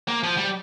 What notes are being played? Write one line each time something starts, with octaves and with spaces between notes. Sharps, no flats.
A#3
F3
G3